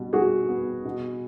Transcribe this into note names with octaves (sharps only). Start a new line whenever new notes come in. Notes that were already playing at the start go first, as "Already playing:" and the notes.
Already playing: B2 G3
G3 F#4 G#4
B3
B2